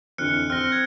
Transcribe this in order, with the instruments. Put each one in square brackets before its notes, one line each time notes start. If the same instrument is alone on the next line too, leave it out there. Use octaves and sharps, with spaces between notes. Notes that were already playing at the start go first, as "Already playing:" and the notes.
[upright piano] F2 D3 E3 [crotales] F6 F#6 C#7
[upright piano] C4 [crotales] F6 A#6
[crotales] F#6 G#6